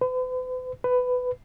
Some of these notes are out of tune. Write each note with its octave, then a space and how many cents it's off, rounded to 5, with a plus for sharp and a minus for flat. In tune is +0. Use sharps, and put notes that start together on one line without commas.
B4 +45
B4 +15